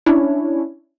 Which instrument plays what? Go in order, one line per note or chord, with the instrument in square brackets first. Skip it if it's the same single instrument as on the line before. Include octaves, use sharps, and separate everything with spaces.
[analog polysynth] C#4 D4 E4 C#5